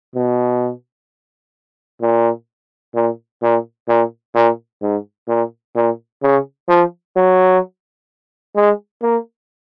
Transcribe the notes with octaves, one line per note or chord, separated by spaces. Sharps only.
B2
A#2
A#2
A#2
A#2
A#2
G#2
A#2
A#2
C#3
F3
F#3
G#3
A#3